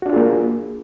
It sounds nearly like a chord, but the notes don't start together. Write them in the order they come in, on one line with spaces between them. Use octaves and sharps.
F#4 D4 F4 G#4 A#3